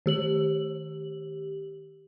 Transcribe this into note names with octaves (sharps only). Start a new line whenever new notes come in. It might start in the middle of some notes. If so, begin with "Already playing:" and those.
D#3 G4 F#7